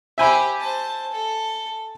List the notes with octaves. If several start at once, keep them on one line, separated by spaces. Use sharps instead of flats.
G4 C5 E5 G#5 B5
C5 A5
A4